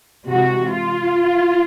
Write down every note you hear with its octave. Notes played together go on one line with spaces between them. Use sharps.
C3 E3 G#3 F#4
F4